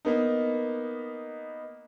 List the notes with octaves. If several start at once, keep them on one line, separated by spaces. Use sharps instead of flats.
A#3 B3 D#4